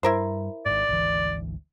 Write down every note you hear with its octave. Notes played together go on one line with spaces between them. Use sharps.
G2 E4 A#4 C5
G#1 G#2 D5
G#1 D2 E3